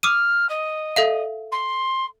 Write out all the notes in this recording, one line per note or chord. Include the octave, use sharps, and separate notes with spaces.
D6 D#6 F6 D#7
D#5
A4 E5 F5
C6